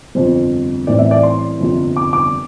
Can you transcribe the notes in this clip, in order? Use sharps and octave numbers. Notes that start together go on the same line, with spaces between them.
G1 F2 C3 G3 C4 C5
A1 A2 E3 G3 C4 D5
E5
D5
C6
G1 F2 C3 G3
D6
D6